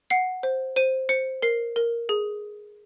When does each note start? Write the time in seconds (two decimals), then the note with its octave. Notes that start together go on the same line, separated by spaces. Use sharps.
0.10 F#5 C7
0.43 C5
0.76 C5 D#7
1.09 C5 C#7
1.42 A#4 C7
1.76 A#4
2.09 G#4